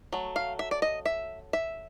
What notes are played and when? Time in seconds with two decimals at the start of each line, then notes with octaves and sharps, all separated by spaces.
0.13 F#3 A3
0.36 F5
0.59 E5
0.71 D5
0.82 D#5
1.06 E5
1.53 E5